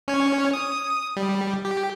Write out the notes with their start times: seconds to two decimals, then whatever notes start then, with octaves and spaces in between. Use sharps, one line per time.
0.08 C#4 C#5
0.53 D#6
1.16 G3
1.65 G4